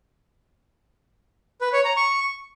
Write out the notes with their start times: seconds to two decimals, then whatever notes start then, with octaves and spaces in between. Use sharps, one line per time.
1.61 B4
1.73 C#5
1.85 A#5
1.96 C#6